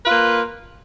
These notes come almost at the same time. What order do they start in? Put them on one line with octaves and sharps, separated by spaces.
B4 F4 A#3